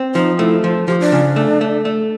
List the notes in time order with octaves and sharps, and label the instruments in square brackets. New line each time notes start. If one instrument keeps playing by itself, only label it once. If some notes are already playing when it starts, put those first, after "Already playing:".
Already playing: [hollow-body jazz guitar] C4
[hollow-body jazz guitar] F3 [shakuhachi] D#4
[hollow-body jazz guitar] A3 [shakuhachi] E4
[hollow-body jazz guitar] F3 [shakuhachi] F4
[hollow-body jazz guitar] F3 [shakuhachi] G4
[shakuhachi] D4
[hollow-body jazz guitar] C#3
A3
A3
A3